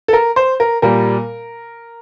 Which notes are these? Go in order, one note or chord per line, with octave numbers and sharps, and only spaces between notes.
A4
A#4
C5
A#4
A#2 G3 A#4